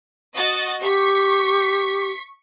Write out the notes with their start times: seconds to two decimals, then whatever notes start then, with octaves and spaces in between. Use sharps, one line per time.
0.35 F#4 D#5 A6
0.81 G4 C#6 B6